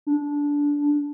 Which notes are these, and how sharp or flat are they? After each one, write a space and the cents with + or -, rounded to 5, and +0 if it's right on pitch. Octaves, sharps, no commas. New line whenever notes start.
D4 -15